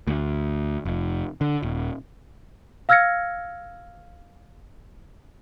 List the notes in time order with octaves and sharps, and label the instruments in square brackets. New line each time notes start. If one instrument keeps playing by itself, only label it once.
[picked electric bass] D2
F1
D3
D#1
[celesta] F5 E6 F6 G#6 A#6 C#7